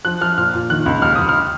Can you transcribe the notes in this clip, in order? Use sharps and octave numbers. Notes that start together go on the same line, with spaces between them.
F3 F#6
F3 F6
A#2 F6
A#2
D#3 F#6
C#2
D#2 F6
D#2 D#6
F6